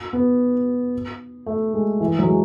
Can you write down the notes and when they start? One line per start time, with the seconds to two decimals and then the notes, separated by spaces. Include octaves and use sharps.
0.13 B3
1.46 A3
1.73 G#3
2.00 E3
2.19 F#3
2.27 G#3